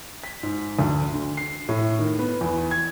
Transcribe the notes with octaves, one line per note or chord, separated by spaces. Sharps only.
B6
G#2
D2
D3
C7
A2
D#3
B3
E2
G#6